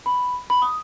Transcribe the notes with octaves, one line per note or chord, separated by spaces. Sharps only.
B5
B5
D#6